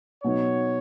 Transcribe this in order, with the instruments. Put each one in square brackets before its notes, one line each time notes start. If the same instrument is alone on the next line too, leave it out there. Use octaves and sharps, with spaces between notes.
[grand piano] B2 F#3 B3 D#4 [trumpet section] C#5